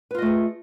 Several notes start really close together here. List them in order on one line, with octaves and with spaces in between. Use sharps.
B4 F4 D#5 A3 G#4